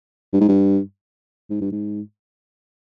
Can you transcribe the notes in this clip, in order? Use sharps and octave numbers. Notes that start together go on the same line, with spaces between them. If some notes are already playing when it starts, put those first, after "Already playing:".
G2
G#2
G2
G#2
G2
G#2